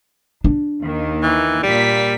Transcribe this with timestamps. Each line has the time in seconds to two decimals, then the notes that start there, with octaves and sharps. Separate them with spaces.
0.44 D4
0.81 D#2 D#3
1.23 E3
1.63 A#2 G3 B6